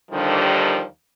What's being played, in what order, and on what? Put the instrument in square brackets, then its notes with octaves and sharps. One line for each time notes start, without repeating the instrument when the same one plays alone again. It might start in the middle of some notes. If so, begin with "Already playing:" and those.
[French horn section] D#2 D3 D#3 F3 G3